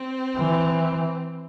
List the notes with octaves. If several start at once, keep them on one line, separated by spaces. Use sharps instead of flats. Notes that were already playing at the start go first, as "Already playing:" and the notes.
Already playing: C4
E3